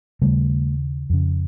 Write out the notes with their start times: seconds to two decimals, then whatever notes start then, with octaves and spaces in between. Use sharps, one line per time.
0.22 D#2 C#3 G3 A3
1.10 F2 C#3